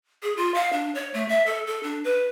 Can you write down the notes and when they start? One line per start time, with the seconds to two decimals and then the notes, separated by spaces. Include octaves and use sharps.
0.23 G#4
0.37 F4
0.54 F5
0.73 D4
0.95 C#5
1.14 A3
1.28 E5
1.46 A4
1.67 A4
1.83 D4
2.04 B4